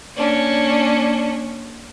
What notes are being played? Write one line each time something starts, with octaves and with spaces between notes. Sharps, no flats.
A#3 C#4 D4